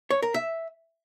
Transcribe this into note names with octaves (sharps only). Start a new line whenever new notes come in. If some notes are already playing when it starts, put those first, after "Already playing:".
C#5
A#4
E5